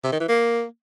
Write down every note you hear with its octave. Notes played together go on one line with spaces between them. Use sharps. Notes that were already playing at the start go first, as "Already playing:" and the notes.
C3
D#3
E3
A#3